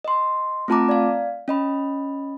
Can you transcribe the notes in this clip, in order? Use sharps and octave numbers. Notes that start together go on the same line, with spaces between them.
D#5 C6
A3 C4 F4 A5 A#5 D6
D5 F5
C#4 D#5 B5